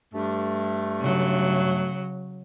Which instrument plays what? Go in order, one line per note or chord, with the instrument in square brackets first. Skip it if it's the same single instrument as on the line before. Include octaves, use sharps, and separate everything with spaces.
[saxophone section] G2 A3
[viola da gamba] C#3 F#3